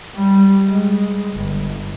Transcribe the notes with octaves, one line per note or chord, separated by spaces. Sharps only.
G3
G#3
G1